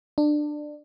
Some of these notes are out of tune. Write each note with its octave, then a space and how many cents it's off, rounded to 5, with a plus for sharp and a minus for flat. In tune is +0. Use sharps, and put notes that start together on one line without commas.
D4 +20